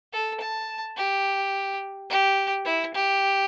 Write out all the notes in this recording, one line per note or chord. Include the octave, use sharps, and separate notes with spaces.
A4
A5
G4
G4
E4
G4